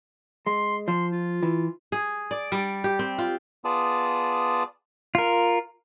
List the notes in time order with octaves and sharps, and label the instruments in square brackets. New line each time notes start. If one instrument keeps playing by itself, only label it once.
[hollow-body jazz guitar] G#3 [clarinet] C6
[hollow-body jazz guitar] F3 [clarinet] C6
[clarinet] F4
[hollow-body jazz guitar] E3
[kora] G#4
D5
G3
G4
C4
F4
[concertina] B3 F4 G#4 D5 A5 D#6
[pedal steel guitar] F4 A#4